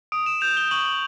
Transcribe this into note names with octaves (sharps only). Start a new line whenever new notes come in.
D#6 D7
E7
G6 F7
G7
C#6 F#7
F#7